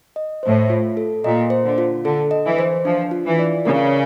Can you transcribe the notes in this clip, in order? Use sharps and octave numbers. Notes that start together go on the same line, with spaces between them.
D#5
A2 C5
F4
A4
A#2 D#5
C5
D3
F4
D3 A4
D#5
E3
C5
F3 D4
F4
E3
D5
C#3 A#4